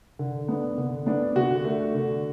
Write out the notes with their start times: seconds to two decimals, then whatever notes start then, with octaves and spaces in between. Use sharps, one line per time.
0.19 D3
0.48 B3 D4
0.78 D3
1.06 B3 D4
1.36 D3 F#4
1.65 A3 D4
1.94 D3